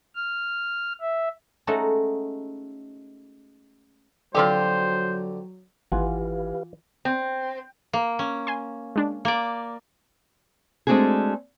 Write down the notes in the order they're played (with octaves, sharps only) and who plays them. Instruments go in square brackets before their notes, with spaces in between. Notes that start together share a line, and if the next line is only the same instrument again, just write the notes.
[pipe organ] F6
E5
[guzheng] G#3 A3 C#4 D#4 F#4 A4
[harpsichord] D3 [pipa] F3 C4 G4 [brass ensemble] F#3 [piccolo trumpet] C5
[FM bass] G#1 [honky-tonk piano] E3 [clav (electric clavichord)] F4 F#5 G#5 [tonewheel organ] G4 B4 F5
[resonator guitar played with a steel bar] C4
[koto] A#3
C#4
[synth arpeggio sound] G#5 C6
G#3 D4
[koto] A#3 D5
[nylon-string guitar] G#3 A3 C4 D4 F#4 G#4